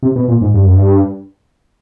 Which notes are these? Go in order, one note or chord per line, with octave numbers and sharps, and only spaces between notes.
C3
B2
A#2
G#2
G2
F#2
G2